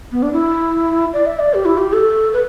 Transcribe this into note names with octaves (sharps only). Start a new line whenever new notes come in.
B3
D4
E4
D5
E5
D5
G4
E4
G4
A4
B4